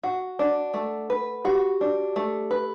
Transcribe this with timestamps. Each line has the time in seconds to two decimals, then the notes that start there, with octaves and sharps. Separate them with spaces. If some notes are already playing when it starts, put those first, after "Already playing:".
0.03 F#4 F#5
0.39 D4
0.74 A3
1.10 B4
1.45 F#4 G4
1.81 D4
2.16 A3
2.51 B4